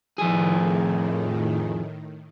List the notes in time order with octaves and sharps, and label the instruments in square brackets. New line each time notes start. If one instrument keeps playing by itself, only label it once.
[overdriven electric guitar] F2 G#4 [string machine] A2 D#3